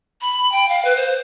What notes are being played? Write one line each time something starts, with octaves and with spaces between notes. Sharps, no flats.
B5
G5
F5
B4
C5